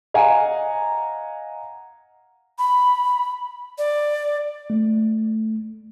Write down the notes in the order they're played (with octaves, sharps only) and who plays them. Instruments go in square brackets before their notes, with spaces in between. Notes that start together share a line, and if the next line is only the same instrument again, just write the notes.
[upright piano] D#5 F5 F#5 G#5 A#5
[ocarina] B5
D5
[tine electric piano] A3